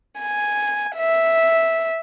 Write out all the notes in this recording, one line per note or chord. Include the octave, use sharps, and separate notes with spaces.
G#5
E5